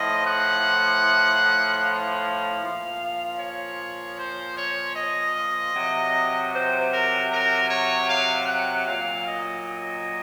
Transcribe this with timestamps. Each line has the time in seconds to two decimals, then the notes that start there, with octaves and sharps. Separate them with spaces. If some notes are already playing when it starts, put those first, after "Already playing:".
Already playing: A2 F3 D#5
0.26 F#5
1.83 F5
2.61 A#2 F3
3.39 C#5
4.18 C5
4.57 C#5
4.96 D#5
5.73 C3 F#3
6.53 C5
6.91 A#4
7.30 A#4
7.69 C#5
8.09 F5
8.47 F#5
8.86 A#2 F#3 F5
9.26 D#5
9.66 D#5